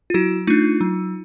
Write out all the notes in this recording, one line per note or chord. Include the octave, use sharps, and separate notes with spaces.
F4
F#3 E4 F#4
A3 D4 D#4 F4
F#3